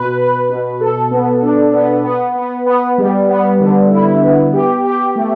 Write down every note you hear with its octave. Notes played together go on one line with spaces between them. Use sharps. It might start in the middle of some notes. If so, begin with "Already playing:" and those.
Already playing: B2 B4
B4
B2
A4
B3
D4
B3
B3
B3
B3
G3
B3
D3
E4
B3
G4
G4
A3